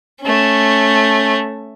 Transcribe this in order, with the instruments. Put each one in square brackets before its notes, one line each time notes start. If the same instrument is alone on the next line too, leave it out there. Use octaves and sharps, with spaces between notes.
[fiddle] A3 C#4